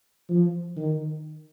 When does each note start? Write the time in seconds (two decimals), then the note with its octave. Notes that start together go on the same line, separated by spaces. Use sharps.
0.29 F3
0.77 D#3